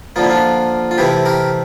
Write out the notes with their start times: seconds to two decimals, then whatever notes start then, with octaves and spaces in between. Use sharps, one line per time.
0.16 D3 F3 A#3 F4
0.24 E4
0.30 D4 F4
0.91 F4
0.98 C3 E3 A3 C4 E4 G4
1.26 G4 A#4